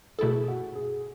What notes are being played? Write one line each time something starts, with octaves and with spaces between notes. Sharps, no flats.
B2 A3 E4 G#4 A4
F#4
G#4